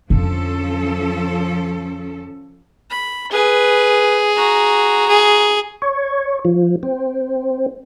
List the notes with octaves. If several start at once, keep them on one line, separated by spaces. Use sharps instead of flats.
F2 D3 F3 C#4 A4
B5
G#4 B4
F#4 A#5
G#4
C#5
F3
C4